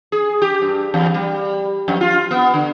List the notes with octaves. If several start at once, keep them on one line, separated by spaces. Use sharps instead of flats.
G#4
G4
G2
E2
G3
F2
F4
B3
D3